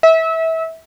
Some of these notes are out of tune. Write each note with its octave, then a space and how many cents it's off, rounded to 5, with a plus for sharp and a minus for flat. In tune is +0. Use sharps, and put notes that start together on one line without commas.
E5 -25